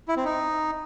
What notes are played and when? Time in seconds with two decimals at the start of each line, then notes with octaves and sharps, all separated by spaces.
0.08 E4
0.17 C4
0.25 D#4